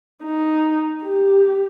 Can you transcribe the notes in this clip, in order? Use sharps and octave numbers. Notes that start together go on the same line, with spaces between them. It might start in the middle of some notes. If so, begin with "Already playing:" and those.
D#4
G4